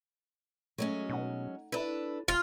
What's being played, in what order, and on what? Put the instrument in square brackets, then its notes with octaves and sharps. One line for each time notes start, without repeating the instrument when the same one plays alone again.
[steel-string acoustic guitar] F#3 G#3 C#4 [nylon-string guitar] A3 F#4 D#5
[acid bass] B2 [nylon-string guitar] D#4 F#5
[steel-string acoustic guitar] D4 A4 B4 [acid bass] E4
[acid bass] E1 [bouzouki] F4